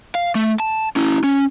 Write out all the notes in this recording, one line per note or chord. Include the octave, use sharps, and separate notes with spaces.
F5
A3
A5
C#4 E4
C#4